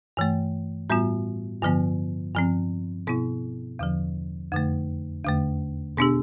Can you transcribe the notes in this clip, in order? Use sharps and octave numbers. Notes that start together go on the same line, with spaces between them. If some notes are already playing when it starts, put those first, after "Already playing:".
G2 E3 A3
A2 G3 B3 F4
G2 D3 F3 B3
G2 F3 C4
B2 B3 E4
E2 D3 F3
F2 D3 A3
E2 D3 A3
B2 B3 D4 G4